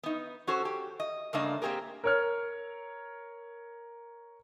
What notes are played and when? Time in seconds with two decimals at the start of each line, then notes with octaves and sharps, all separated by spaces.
0.03 B3 D#4
0.47 C#4 F#4 A4 C5
0.65 G4
1.00 D#5
1.33 G2 C#3 A3 A#3 D4 D#5
1.62 A#3 C4 G4 G#4 A#4
2.04 A#4 C#5 F6